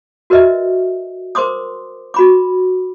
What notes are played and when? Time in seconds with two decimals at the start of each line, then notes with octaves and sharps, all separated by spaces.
0.30 F#4 A#4 B4 D#5 E5
1.35 A#4 C5 C6 D6 D#6
2.14 F#4 B5 D6